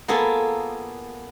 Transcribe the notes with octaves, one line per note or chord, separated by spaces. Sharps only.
A#3 B3 F4 G#4 A4